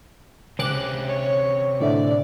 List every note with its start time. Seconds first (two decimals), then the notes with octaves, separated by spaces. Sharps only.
0.59 C#2 C3 C4 C#4 D6 F#6
1.08 C#5
1.80 A2 D3 D5 E5